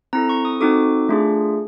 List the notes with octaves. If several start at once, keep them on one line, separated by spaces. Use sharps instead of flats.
C4 E4 A4 A#5
C#6
D#6
C4 D#4 F#4 A4 D6
A3 D4 F4 G#4